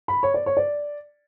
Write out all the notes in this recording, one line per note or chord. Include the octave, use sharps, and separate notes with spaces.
B5
C#5
D5
C#5
D5